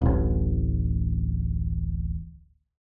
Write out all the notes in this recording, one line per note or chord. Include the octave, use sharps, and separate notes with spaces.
D1 A1